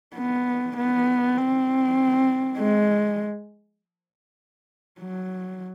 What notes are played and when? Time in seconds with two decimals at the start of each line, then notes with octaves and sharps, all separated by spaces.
0.16 B3
0.77 B3
1.37 C4
2.58 G#3
5.01 F#3